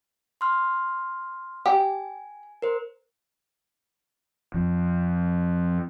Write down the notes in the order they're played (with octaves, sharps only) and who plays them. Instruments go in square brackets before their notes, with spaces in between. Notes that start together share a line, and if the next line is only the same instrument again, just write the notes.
[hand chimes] C6 F6
[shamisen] G4 [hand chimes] G#5
[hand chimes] A#4 C5
[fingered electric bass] F2